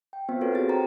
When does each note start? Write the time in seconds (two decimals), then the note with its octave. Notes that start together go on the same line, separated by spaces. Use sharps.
0.13 G5
0.29 B3 C4 F4 C5
0.41 C4 F#4 A4 B4 C#5
0.52 E4 G#4 A6
0.69 G4 C5 G5 A#5